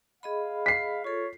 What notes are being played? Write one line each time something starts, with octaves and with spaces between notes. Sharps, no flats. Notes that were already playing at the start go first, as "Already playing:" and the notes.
G#4 D#5 F5 B5
B6 C7
F4 A4 C#5